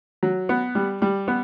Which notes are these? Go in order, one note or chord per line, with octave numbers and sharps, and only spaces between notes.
F#3
B3
G3
G3
B3